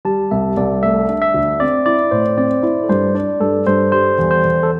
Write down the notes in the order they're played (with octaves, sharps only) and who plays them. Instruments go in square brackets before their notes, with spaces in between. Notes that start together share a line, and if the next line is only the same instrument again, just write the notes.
[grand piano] G3 [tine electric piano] A5
[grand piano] C2 [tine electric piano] E5
[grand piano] C2 [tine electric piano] D5
[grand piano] A3 [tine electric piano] E5
[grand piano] D4
[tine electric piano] E5
[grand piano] D2
[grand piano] C4 [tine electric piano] D5
[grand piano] E4 [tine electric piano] D5
[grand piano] A2 [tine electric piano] C5
[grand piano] C4 [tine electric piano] D5
[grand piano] E4 [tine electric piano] C5
[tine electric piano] A4
[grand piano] G2 [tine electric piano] C5
[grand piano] D4 [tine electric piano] D5
[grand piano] G2 [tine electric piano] A4
[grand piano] G2 [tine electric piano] C5
[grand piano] G3 [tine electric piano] C5
[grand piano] E2
[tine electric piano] C5
[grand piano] E2
[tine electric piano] A4